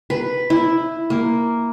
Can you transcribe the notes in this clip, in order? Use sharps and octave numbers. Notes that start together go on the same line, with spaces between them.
B4
E4
A#3